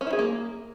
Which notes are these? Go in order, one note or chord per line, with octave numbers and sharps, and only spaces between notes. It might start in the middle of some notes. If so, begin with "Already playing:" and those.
C#4
E4
G#4
A#3